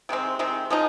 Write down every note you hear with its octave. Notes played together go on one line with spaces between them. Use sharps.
C3 D#3 G#3 C4
C3 D#3 G#3 C4
F3 G#3 D#4